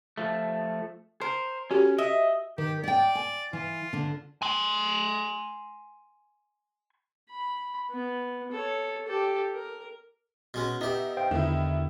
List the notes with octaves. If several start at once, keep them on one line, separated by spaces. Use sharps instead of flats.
F3 A3
A#4 C5
C#4 F#4 G4 A4
D#5 E5
D#3 G4
D5 D#5 G5
G#5
E3 F4
D3 D4
G#5 C6
B5
B3
A4 C#5
G4 A4
A#4
B2 G#3 C#4
B3 D#4 G4 E5
C5 F5 G5
E2 D3 D#3 E4